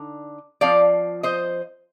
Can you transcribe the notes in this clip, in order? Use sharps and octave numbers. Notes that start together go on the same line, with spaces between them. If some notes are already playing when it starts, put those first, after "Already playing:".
Already playing: D3 D#4
F3 C4 F4 D5 F5
C5 D#5